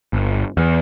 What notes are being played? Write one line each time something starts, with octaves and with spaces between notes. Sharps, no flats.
G1
E2